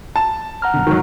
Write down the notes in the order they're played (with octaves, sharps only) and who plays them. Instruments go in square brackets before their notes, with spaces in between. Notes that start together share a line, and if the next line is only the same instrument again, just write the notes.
[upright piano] A5
[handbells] F#5 A#5 F6
[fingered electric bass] F#2 B2 D3
[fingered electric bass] D2 G#2 [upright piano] D#3 F#3